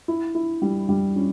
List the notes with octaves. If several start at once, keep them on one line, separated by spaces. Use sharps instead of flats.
E4
E4
G3
G3
C#4